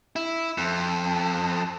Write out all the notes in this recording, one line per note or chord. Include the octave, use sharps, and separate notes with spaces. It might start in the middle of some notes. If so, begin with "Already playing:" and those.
E4
F2